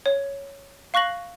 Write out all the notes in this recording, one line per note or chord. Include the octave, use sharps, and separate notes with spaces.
C#5
F5 C#6 F#6 A#6 F#7